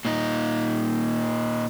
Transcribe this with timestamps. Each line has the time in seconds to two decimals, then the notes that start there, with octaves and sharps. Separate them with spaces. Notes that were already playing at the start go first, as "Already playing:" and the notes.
0.05 A#2 D#4